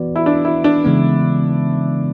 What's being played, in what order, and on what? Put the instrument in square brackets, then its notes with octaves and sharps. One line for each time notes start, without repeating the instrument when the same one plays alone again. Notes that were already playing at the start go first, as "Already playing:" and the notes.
Already playing: [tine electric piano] E3 B3 F#4 B4 D5
[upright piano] E4
D4
E4
D4
[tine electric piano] C#3 E3 G#3 B3